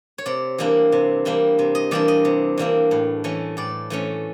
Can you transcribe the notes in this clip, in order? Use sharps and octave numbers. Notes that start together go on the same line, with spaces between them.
C#5
C3 D5
E3 G3 A#3 D4
C3
E3 G3 A#3 D4
C3
D#5
E3 G3 A#3 D4 D5
D#5
C3
E3 G3 A#3 D4
A2
E3 A3 C#4
A2 D5
E3 A3 C#4